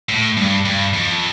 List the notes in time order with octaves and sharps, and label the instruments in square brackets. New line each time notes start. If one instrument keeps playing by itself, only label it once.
[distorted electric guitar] A2
G2
G2
F2